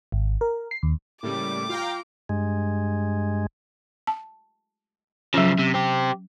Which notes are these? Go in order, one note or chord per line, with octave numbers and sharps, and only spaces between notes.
G#1
A#4
C7
D#2
A2 C#3 G3 A#3 D6
F4 F5 G5 A#5
G2 G#3
A5
C#3 F3 F#3 C#4
C3
C4 G4